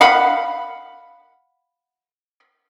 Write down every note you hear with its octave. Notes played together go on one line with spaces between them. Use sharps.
F5 F#5 B5